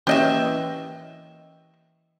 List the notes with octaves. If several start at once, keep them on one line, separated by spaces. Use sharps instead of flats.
E3 A#3 C#4 G4 D#5 E5